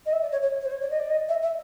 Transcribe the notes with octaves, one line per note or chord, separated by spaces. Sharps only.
D#5
E5
D5
C#5
C#5
C#5
C5
C#5
D5
D#5
D5
D#5
E5
E5